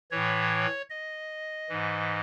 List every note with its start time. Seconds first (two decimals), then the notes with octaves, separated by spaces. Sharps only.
0.11 A2 E3 C#5
0.90 D#5
1.69 G#2 E3